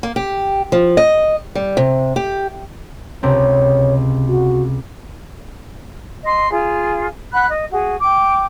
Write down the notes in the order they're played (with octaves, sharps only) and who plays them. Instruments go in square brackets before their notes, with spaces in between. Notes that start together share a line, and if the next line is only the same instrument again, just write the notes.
[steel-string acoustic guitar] A#3
G4
F3
D#5
G3
C3
G4
[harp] C#2 C3 C4 [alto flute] C#5
[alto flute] F#4
[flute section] D#5 C6
F4 G#4
F#5 B5 F#6
D#5
F#4 G#4
G5 D6